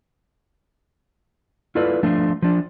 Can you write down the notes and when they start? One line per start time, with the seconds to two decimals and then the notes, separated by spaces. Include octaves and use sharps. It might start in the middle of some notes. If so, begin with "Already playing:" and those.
1.75 E4 F4 A4 B4 D5
2.03 F3 A3 D4 F4
2.42 F3 D4